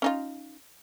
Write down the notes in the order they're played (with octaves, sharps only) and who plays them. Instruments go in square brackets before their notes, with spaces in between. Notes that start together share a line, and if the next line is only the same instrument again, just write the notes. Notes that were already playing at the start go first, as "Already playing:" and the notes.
[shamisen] C#4 D#4 F4